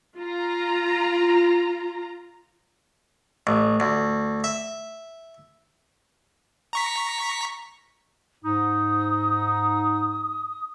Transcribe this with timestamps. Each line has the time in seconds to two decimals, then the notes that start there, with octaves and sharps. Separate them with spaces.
0.18 F4 A#5
3.47 A1
3.80 D2
4.44 E5
6.73 A#5 C#6 B6
8.45 G#2 D#4 D#6